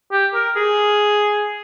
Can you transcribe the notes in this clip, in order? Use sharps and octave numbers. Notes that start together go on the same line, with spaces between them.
G4
A#4
G#4